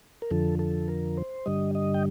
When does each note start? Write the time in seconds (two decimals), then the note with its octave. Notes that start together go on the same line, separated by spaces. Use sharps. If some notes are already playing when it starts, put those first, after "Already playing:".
0.22 A#4
0.31 F2 D3 F3 A4
0.59 A4
0.88 A#4
1.17 C5
1.46 G2 D3 G3 D#5
1.75 D#5
1.94 G5